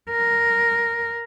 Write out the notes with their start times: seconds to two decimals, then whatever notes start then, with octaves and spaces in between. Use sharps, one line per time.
0.10 A#4